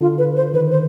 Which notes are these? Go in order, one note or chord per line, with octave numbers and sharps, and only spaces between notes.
D3 F4
B4
C5
D#3 B4
C5